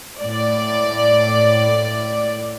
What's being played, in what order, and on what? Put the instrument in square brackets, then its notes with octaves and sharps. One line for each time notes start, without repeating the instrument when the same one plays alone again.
[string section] A2 D5